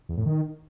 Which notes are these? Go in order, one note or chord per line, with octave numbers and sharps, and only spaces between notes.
E2
A2
D#3